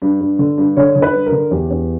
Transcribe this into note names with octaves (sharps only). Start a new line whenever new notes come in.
G2
G2
D3
G2
D3 C#5
D3
B4
G2
A#4
D3
E2 G4
E2